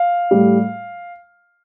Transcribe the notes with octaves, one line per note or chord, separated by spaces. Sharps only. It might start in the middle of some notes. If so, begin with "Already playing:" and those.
Already playing: F5
A2 G3